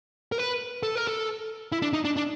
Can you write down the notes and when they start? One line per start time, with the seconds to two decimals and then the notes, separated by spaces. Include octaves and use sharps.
0.32 A#4
0.38 B4
0.83 A4
0.95 A#4
1.07 A4
1.72 E4
1.82 D4
1.93 D#4
2.05 D4
2.17 D4